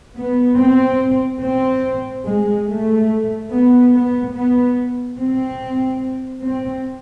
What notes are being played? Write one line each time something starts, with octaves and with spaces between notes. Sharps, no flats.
B3
C4
C4
G#3
A3
B3
B3
B3
C4
C4